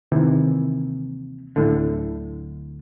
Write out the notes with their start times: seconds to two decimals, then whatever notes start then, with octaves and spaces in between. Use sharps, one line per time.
0.12 D#2 C3 D#3 E3
1.56 D1 A2 D3